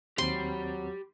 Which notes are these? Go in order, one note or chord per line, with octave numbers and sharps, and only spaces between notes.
D#2 F#3 C4 G4 B5 C6